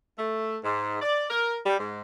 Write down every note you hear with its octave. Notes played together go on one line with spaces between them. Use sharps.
A3
G#2
D5
A#4
G3
G#2